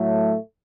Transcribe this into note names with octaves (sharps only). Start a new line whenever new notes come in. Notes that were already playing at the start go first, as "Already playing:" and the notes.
Already playing: A2 F#3 A3